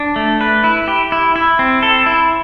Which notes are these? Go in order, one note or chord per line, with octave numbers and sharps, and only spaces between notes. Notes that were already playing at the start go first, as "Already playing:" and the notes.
Already playing: D4
A3
B4
E4
G4
E4
E4
C4
A4
E4